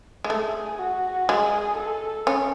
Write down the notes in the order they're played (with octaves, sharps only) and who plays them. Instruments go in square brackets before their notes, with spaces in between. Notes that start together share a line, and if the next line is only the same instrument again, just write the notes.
[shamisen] G#3
[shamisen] A3 [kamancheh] G#4
[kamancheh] F#4
[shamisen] G#3 [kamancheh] G#4
[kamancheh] A4
[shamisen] C#4